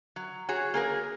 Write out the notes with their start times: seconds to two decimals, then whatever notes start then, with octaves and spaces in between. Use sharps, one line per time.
0.16 F#3
0.49 F#4 G#4 C#5
0.74 A#3 G#4 A#4